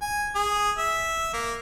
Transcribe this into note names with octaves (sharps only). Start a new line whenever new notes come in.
G#5
G#4
E5
A#3